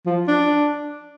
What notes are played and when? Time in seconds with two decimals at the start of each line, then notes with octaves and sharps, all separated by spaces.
0.06 F3
0.28 D4